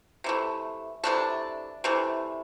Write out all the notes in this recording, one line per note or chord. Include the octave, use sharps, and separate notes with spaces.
C3 E3 A3
C3 E3 A3 D4
C3 E3 A3